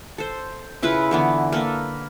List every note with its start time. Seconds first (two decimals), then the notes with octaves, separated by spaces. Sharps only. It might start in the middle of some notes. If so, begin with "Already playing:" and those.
0.18 A4 C5
0.83 C#3 E4 F4 B4
1.11 D3 E3 B3
1.52 A#3 A4 B4